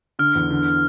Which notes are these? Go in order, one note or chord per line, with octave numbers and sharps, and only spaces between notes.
D3 F6
E2
D3